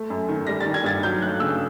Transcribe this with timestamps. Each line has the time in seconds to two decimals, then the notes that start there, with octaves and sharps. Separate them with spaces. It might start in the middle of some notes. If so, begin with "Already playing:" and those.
Already playing: A3
0.10 F#2
0.29 D#3
0.47 G3 A#6
0.61 D#3 A6
0.74 G#6
0.84 G2 A6
1.03 F#3 G6
1.22 A3 F#6
1.40 C#3 E6